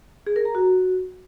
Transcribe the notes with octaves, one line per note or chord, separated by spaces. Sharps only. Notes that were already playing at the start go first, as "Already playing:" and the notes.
G#4
A#4
A#5
F#4